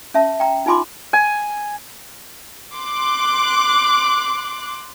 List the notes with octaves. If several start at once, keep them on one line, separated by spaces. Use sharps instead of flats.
C#4 E5 A5
G5 A#5
D#4 F4 G#5 B5 C6 D6
G#5
C6 D6 F#6